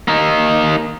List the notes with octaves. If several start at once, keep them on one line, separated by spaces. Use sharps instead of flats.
A#3 D#4